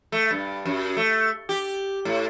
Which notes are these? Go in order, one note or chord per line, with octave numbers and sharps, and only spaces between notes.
A3
G2
F#2
A3
G4
A2